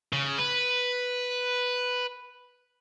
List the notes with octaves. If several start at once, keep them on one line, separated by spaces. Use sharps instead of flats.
C#3
B4